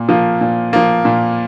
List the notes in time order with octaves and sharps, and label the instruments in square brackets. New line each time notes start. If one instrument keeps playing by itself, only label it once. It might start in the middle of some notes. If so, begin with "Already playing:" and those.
Already playing: [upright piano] A#2
F3 A#3
A#2
F3 A#3
A#2